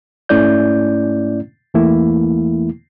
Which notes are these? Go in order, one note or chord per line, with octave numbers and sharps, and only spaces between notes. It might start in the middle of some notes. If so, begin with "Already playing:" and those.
G#2 A3 C#4 E4 D5 G6
E2 E3 A3 A#3 E4